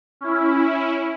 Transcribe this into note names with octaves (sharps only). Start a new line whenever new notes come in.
C#4 E4